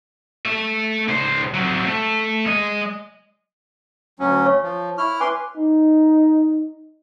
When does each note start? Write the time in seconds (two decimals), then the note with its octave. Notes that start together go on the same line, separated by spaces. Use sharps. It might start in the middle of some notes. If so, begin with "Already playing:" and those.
0.46 A3 E5
1.08 C#2 C5
1.54 F#3 C4
1.86 A3
2.46 G#3 D#5
4.19 D2 F#3 C#4
4.46 C#5 F5 C#6
4.63 F3
4.98 E4 C#6 F6
5.20 B4 G#5 C6 D6
5.56 D#4